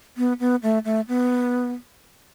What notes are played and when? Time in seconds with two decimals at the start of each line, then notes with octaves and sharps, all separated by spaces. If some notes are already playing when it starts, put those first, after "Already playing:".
0.17 B3
0.40 B3
0.63 A3
0.85 A3
1.08 B3